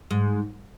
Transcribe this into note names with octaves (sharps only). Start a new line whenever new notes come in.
G#2